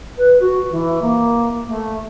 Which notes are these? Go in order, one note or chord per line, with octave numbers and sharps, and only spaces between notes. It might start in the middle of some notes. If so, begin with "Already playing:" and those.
B4
F#4
E3
A#3
A3